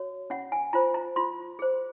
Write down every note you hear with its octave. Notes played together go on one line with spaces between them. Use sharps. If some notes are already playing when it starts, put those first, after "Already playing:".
Already playing: F#4 C#5
C#4 F#5
G#5
F4 C5 A#5
A#5
F4 C6
G#4 C5